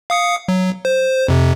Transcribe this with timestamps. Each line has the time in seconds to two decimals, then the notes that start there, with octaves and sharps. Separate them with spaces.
0.10 F5 D#6 C#7
0.48 F#3
0.85 C5
1.28 F2 C3